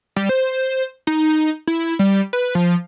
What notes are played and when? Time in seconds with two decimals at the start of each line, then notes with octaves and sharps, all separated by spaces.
0.16 G3
0.29 C5
1.07 D#4
1.67 E4
1.99 G3
2.33 B4
2.55 F3